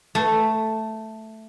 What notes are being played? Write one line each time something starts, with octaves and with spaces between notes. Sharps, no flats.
A3